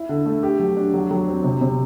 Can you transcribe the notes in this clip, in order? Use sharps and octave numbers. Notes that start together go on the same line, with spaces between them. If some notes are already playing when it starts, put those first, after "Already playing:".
Already playing: E4
D3
A3
G4
F#3
D4
F#3
F#3
C4
C3
C3